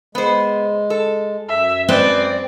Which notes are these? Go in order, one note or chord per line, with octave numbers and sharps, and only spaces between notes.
G#3 B3 C5
A4
F#2 E5
G#3 C4 B4 C5 D5